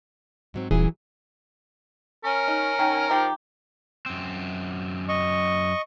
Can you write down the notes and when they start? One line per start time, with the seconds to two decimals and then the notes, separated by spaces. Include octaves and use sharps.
0.54 G#2 F#3 C4
0.71 D#1 E3 F#3 G#4
2.24 C#4 A#4
2.48 D#4
2.79 D#3
3.10 F3 D#4 G4
4.06 F#2 C4
5.09 D#5 C#6